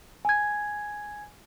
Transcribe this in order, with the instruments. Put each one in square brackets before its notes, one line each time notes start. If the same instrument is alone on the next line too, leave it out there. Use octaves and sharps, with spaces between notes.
[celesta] G#5 G#6